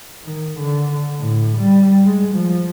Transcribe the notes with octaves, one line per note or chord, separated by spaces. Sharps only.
D#3
D3
A2
G3
G#3
F3